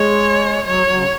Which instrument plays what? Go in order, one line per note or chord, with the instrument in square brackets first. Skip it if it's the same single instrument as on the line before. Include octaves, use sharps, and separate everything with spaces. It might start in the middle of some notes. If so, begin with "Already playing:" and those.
Already playing: [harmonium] G#3 [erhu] C#5
[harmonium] F#3 [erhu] C#5
[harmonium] F#3
C#3